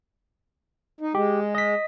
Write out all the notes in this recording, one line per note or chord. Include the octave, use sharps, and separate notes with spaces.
D#4
G#3 G4
D#5 B6